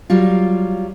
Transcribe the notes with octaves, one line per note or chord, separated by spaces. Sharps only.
F#3 G3 F4